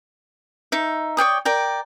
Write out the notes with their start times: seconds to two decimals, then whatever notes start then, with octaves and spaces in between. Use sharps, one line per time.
0.72 D#4 E5
1.17 C#5 D5 G5 D#6
1.45 A#4 D5 G5